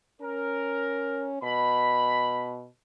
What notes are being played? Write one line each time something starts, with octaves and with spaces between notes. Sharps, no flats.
C#4 A#4
B2 B5